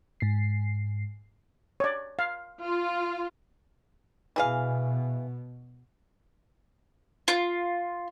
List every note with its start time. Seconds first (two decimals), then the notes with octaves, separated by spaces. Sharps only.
0.20 G#2 C7
1.80 C#5 D5
2.19 F5
2.62 F4
4.36 B2 E3 G#4 F5
7.28 F4